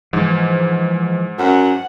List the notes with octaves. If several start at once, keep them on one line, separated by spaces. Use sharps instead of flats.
G#2 E3 F3
F#2 F#5